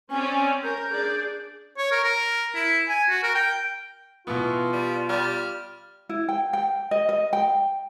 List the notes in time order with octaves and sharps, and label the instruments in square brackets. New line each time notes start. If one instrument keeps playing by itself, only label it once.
[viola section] C4 C#4 D5 [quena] G#5
[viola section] A#4 [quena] G6
[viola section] D4 G#4 D5
[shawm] C#5
A#4
A#4
E4
G#5
F#4
A#4
G5
[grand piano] B2 B3 [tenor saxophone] E3 [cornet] F4
[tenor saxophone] G3
[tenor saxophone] G3 [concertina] F6
[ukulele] E4
G5
G5
D#5
D#5
G5